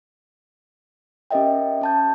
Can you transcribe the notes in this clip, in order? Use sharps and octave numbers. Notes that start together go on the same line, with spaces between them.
C#4 G4 A#4 D#5 E5 G5
C#4 A5 G6